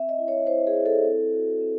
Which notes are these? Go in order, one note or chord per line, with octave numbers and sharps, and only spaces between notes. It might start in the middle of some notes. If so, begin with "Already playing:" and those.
Already playing: C4 E5
D#5
E4
C#5
E4 C5
G#4
E4
A4
C4
F#4
C4